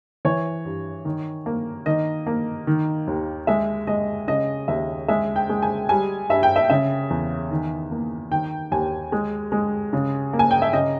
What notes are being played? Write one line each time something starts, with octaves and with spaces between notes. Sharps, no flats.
E3 C#5
G2
D#3
A#3
D#3 D#5
A#3
D#3
D#2
G#3 E5
G#3 D#5
C#3 D#5
D#2 E5
G#3 E5
G5
G#3
G#5
G3 G#5
G2 E5
G5
E5
C#3 E5
E2
D#3
A#3
D#3 G5
D#2 G#5
G#3
G#3
C#3
A#3
G#5
G5
E5
C#3 D#5